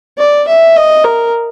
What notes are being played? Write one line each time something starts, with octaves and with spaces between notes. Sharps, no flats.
D5
E5
D#5
A#4